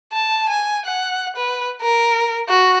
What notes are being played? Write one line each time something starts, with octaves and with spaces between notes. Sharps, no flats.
A5
G#5
F#5
B4
A#4
F#4